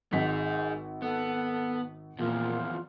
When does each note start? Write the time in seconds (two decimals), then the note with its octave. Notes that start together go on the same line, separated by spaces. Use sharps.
0.13 G#1 D#4 G#4 B6
1.02 B3 A4
2.19 E2 A#2 F3 F4